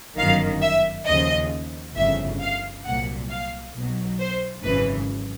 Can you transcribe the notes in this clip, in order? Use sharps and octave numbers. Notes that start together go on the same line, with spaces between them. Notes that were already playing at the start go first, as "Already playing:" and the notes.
G1 F#2 D#3 F#3 F5
E5
D#2 C#3 F3 D#5
G1 F2 C#3 E5
F5
C2 A#2 F#3 F#5
F5
B1 B2 F#3
C5
G#1 F#2 C#3 E3 B4